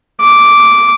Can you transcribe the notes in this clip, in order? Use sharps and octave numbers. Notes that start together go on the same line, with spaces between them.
D6